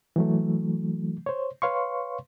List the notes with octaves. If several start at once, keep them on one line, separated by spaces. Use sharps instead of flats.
E3 F#3 A3
C5 C#5
B4 C#5 F5 C6 C#6